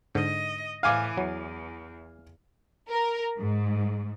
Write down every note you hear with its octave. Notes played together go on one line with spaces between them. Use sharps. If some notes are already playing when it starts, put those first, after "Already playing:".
G#2 D3 D#5
A2 E3 F5 G#5 D6
E2 F#3
A#4
G#2